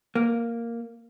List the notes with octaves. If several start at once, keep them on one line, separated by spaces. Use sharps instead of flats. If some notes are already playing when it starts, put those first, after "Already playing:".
A#3